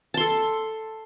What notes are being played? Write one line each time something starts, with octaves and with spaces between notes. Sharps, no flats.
A4 A5 C6